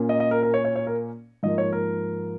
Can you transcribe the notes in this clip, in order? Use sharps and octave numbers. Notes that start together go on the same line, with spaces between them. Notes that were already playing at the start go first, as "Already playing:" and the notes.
Already playing: A#2 A#3 C#4
D#5
D#5
A#4
A#4
C#5
C#5
C#5
A#4
G#2 F3 A#3 D#5
C#5
A#4